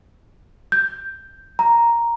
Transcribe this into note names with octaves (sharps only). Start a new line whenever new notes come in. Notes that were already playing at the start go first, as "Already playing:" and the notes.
G6
A#5